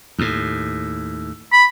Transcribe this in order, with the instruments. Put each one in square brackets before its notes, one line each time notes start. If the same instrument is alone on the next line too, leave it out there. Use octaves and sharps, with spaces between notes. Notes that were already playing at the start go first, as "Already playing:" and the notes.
[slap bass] D#2 A2
[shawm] B5